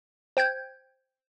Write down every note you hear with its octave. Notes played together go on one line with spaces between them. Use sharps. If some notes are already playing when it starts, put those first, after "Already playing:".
C5 G5 G6 G#6